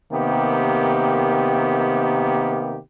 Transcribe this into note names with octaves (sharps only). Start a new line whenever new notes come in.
C3 D#3 A#3 B3 G4